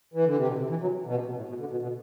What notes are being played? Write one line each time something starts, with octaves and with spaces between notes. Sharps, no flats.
E3
D3
C3
B2
C3
E3
F#3
B2
C3
B2
A2
B2
D3
B2
B2